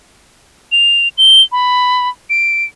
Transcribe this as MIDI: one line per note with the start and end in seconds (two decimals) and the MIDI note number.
0.72 1.08 101
1.18 1.41 103
1.52 2.09 83
2.30 2.65 98